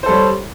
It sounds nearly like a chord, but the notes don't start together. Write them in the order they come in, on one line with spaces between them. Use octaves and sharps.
C5 A4 G3 C#5